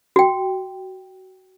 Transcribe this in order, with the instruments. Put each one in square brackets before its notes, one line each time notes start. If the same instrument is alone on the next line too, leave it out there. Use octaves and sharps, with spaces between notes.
[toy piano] F#4 G5